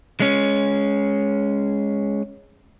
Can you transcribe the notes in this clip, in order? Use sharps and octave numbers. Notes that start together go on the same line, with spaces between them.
G#3 C#4